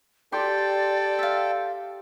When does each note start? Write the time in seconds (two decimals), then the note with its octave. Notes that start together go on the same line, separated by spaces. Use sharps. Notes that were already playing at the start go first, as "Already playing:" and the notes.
0.32 G4 A4 D5 G5 C6
1.19 E5 F5